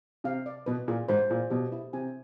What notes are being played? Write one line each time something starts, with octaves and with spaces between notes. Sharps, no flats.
C3 F5
D5
B2 B4
A#2 G#4
G#2 C5
A#2 G#4
B2 G4
E4
C3 G#5